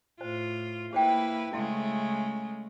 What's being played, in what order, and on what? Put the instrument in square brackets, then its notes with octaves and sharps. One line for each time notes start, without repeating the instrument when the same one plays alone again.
[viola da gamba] A2 F4 [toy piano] C5
[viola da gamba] A#3 E4 B4 [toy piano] G#4 C5 G5
[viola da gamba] C#3 G#3 A3 [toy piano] E4 F5 C6